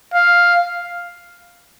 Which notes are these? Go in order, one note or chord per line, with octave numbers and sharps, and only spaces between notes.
F5